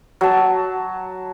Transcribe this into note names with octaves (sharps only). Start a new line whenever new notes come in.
F#3 A5